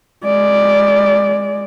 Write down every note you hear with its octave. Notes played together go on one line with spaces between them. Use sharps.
G#3 D5